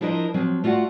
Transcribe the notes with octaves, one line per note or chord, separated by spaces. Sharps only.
F3 D4 E4 A#4 C5 D#5
F3 F#3 C4
A3 F4 F#4 D5 F#5